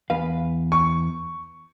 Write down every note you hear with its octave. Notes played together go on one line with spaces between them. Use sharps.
E2 B4 F5
C#6